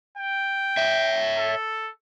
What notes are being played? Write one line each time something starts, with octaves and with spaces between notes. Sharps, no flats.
G5
C#5 E5
A4